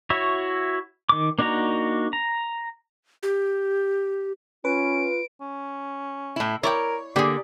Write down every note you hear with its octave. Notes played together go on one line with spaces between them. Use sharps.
E4 F#4 C#5 E5
D#3 D6
A#3 D4 D#4 F#4 A#5
A#5
G4
C#4 F4 B4 D7
C#4
A2 E4
E4 A#4 C#5 D5 G5
D3 A#3 G4 G#4 D5